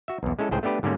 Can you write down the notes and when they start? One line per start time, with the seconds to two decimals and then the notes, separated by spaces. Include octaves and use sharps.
0.08 F#4 E5
0.23 B1 E2
0.39 G#3 C#4 E4 A4
0.51 C#2 A2 G#4 C5 G5
0.63 A3 B3 D4 G4 B4
0.83 G#2 D3 G3 A#3 C#4